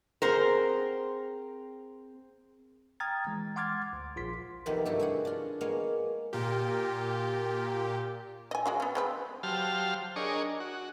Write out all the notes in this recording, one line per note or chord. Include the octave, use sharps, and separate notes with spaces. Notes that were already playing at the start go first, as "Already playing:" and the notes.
C4 G#4 A#4 C5 F#5
G5 A#5 D#6 F6 G#6 A6
E3 G#3
F#5 C6 D6 F6 G#6 A6
D2
A#1 F4 C6 B6
F2 C3 D#3 A#3 B3
G2 A3 E4 F#4
E4 G#4 F#5
D4 F4
G#3 A#3 B3 C#5 F5
A#2 F4 G4 A#4
D#5 G#5
G#3 F#4 F5
B3 C#4
G#3 C4 B4
F#3 G4 C5 F5 A5 F6
D4 G#4 A#4 C#5 D#5 C#6
F#4